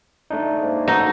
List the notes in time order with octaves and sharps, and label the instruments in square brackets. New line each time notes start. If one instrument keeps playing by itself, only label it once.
[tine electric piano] A3 D4 D#4
[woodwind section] G#2 A#3
[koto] D#4 [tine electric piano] F#4 A4